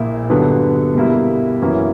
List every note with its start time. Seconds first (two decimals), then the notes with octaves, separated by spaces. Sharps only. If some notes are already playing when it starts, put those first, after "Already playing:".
Already playing: A#1 A#2 A#3 E4
0.29 G2 D3 F#3 B3
0.95 B2 G3 A#3 E4
1.61 F#2 E3 A#3 C#4 F#4